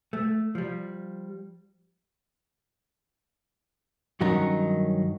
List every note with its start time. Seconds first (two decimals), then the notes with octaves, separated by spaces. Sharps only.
0.13 A3
0.55 F3 G3
4.21 G2 D#3 F#3 C#4 D#4 A#4